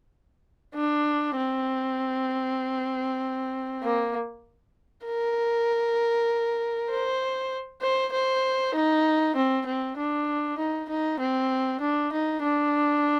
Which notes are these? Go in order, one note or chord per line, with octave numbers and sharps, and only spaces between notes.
D4
C4
A#3
A#4
C5
C5
C5
D#4
C4
C4
D4
D#4
D#4
C4
D4
D#4
D4